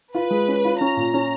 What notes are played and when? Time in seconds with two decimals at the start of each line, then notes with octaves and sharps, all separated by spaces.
0.15 F4 B4
0.30 G#3
0.48 C#4
0.65 F4
0.80 C#4 A#5
0.97 A#2
1.14 C#4